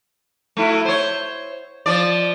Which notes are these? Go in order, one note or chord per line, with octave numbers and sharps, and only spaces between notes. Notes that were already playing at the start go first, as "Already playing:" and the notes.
A3 E4 F#4
C5 C#5
F3 D5